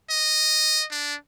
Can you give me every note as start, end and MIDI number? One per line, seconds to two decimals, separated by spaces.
0.10 0.85 75
0.91 1.15 62